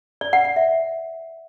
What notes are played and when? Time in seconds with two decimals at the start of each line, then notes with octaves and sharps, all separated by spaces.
0.21 D5
0.33 F#5
0.45 F#5
0.56 E5